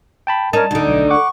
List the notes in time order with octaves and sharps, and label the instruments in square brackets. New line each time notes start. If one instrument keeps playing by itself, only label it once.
[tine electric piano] G5 A5 B5
[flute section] C#4 A#4 [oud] D#4 [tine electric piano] A5
[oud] D2 D3 [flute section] D#4
[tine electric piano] B1
[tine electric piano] F#5 D6 [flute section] C#6